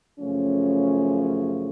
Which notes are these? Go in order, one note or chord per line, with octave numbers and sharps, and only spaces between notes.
F#2 C#3 F3 A3 C#4